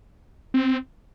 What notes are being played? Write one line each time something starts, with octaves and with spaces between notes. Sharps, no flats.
C4